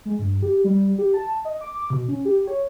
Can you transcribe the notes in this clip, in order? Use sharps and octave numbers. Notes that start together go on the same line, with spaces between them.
G#3
G2
G4
G3
G4
A5
D#5
D6
B2
C#4
G4
C#5